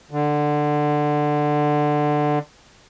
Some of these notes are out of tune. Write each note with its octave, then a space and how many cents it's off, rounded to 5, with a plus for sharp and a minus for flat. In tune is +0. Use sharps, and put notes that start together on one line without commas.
D3 +15